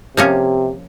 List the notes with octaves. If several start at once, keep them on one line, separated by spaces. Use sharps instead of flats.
C3 F3 A#3 C#4